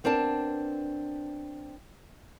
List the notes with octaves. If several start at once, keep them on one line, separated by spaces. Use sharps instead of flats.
B3 C4 D4 A#4 A5